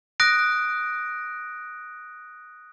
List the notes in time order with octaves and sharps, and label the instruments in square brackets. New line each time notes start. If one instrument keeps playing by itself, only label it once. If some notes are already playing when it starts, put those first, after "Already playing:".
[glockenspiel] D#6 F#6 A#6 D7